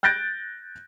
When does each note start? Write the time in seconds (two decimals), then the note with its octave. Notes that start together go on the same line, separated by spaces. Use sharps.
0.03 F#6 G6 A6 A#6 D7